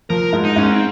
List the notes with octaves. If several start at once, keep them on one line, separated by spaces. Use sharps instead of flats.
F3 A#4
G#2
D#4
G#2 C#4
C4